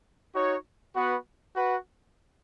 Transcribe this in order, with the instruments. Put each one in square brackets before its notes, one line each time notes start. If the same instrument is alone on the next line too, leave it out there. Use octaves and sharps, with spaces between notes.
[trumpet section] D#4 F#4 C#5
B3 F#4 B4 F#5
F#4 B4 F#5